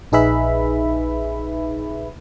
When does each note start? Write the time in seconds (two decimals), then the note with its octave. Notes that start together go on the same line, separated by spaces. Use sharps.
0.12 A#1 D#4 G#4 B4 E5 B5